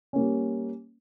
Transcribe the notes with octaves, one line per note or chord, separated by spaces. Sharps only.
G3 A#3 C#4